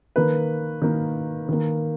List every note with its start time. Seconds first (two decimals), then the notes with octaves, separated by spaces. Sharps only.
0.16 D#3 A#3 B4
0.82 D#3 A#3
1.49 D#3 A#3